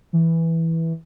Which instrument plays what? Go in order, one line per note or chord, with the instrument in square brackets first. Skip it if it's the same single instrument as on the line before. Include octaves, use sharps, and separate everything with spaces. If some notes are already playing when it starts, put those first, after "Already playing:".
[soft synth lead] E3